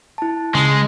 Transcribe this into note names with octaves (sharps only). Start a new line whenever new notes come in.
E4 A5
C#3 G#3